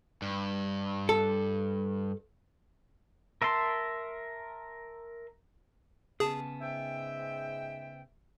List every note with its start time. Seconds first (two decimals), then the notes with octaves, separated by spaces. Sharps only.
0.22 G2
1.09 A4
3.42 A#4 E5 A5 C6
6.20 C#3 B3 G#4 A5
6.61 G#2 E5 G5